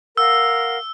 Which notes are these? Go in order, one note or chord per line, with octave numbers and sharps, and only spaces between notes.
A#4 F5 F#5 E6